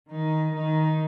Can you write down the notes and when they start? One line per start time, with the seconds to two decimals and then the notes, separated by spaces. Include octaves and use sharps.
0.10 D#3 D#4
0.54 D#3 D#4